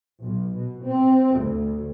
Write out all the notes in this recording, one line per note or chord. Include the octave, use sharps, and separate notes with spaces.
B1
B2
C4
D2